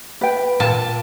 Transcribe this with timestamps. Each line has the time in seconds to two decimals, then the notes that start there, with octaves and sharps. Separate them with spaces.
0.21 B4 G5
0.60 A#2 A5